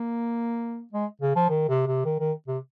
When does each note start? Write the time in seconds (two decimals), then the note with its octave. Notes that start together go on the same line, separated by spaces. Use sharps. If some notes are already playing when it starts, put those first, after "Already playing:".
Already playing: A#3
0.93 G#3
1.21 C#3
1.36 F3
1.49 D#3
1.69 C3
1.87 C3
2.05 D#3
2.19 D#3
2.48 C3